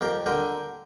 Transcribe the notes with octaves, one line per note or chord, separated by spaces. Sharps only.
F2 G4 A#4
D3 G4 A#4